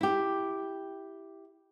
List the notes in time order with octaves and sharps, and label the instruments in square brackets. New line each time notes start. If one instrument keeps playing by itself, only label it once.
[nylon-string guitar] E4 G4